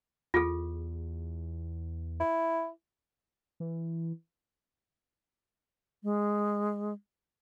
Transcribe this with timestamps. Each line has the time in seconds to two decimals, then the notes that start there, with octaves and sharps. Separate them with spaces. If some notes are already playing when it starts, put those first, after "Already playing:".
0.34 E2 F4 G#4 A4
2.20 E4
3.60 E3
6.03 G#3